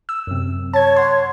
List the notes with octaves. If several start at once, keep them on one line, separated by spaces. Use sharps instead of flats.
E6
F#2 C3
C#5 A5 G#6
F#5 C6